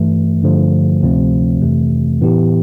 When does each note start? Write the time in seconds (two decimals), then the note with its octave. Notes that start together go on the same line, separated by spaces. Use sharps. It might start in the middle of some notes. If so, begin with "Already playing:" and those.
Already playing: G2 E3 A3
0.43 G2 D3 F3 A3
1.02 D2 C3 F3 A3 C4
1.61 F2 C3 E3 A3
2.21 A2 E3 B3 E4 G4